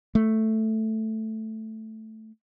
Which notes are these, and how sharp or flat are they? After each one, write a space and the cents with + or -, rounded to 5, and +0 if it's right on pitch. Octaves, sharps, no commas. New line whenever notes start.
A3 +0